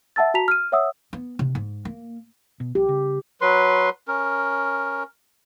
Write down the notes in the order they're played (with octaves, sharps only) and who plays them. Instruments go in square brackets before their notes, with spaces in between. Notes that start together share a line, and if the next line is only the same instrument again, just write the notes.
[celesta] E5 F#5 A5 E6 A6
F#4 A5 A#5 B6 F7
F6 D#7
C#5 E5 F#5 D#6 E6
[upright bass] B3
C3
G#2
A#3
[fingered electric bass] B2
[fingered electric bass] A#1 [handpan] G4
[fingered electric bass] C#3
[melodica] F#3 B4 C6
C#4 A#4